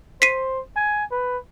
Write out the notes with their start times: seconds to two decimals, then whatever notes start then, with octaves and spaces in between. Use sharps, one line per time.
0.22 C5 B6 C7 D#7
0.76 G#5
1.12 B4